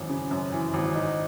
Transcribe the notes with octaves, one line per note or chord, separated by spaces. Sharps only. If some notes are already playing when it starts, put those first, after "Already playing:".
Already playing: G#1 F#2 E3
C#3
F#2
E3
G#1
D#4